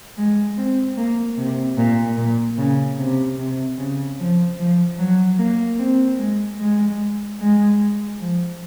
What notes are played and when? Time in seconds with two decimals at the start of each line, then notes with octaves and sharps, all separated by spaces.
0.17 G#3
0.57 C4
0.97 A#3
1.37 C3
1.78 A#2
2.17 A#2
2.58 C#3
2.97 C3
3.38 C3
3.78 C#3
4.19 F3
4.58 F3
4.98 F#3
5.39 A#3
5.79 C4
6.18 G#3
6.59 G#3
7.40 G#3
8.19 F3